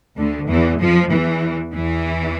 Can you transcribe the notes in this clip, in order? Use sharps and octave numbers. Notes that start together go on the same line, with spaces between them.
D2 D3
E2 E3
F2 F3
E2 E3
E2 E3